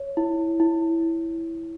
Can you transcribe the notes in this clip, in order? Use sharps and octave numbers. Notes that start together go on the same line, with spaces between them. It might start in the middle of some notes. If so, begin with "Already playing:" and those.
Already playing: C#5
E4
E4